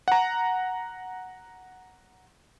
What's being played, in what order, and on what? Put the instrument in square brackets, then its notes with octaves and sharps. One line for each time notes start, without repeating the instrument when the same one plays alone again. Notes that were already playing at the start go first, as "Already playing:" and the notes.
[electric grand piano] F#5 A#5